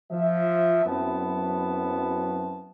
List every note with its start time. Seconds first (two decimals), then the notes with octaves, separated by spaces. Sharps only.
0.11 F3 E5
0.86 F#2 F#3 B3 C4 E4 A5